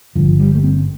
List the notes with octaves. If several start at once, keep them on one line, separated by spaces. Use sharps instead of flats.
G1 G2 D3 F3
G3
A3
C4